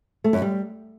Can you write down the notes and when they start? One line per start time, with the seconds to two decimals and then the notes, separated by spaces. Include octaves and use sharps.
0.24 A3
0.33 F#2
0.42 G3